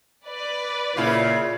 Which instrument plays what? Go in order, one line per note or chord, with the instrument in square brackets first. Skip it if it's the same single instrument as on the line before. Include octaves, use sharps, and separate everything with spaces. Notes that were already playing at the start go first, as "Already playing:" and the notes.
[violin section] B4 D5
[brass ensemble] A#2 [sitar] C#3 F4 [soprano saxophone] E4